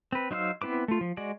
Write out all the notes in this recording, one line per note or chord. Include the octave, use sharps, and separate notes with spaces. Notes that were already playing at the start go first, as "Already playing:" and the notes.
C4 B4
F#3 D#4 C5 F5 E6
B3 C4 E4 B4 D6
A3 F4
F3
G#3 F#4 D5